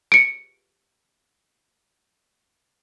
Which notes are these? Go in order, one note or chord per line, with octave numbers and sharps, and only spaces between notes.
C#7 D7